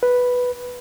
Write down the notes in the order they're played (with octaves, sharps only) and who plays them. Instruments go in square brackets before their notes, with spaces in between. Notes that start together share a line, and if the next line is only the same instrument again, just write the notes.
[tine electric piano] B4